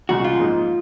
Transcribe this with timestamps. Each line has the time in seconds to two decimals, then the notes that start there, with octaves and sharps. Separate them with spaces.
0.09 C2 A#2 G#3 C#4 F#4
0.24 F4
0.39 G#2 F3 A#3 D#4